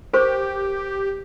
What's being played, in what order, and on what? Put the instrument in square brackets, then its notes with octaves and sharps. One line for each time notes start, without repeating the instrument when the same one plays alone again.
[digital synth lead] G4 [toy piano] A#4 C5 C#6